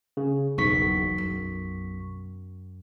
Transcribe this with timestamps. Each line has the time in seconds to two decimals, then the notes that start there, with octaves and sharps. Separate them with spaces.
0.17 C#3
0.58 F#1 B1 E2 C#6 B6
1.18 F#2